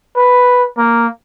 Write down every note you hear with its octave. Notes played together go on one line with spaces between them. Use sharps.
B4
A#3